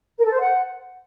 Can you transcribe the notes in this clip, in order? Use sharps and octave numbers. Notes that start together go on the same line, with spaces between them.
A#4
A4
C5
F#5